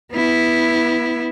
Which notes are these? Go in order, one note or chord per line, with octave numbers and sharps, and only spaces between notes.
B3 E4